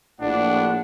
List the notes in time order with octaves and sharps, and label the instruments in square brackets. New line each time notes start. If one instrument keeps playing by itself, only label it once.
[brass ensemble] A#1 A2 F#5 [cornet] D4